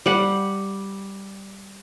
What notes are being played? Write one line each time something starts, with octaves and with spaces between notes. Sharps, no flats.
G3 F#5